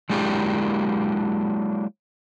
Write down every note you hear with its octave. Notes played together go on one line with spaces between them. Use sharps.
F#3 G#3 A#3 D4 E4 G4